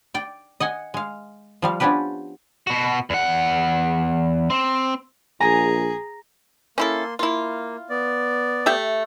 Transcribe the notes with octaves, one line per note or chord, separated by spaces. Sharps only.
D5 G5
D#5 F#5 G#5
G#3 F5
F3 G3 F5
F3 B3 C#4 D4 G4 B4
B2 F#4
E2 F#5
C4
A#1 G#4 G#5 A#5
A#3 C#4 E4 A4 C6
A#3 E4 F4
B3 D5
A3 G4 E5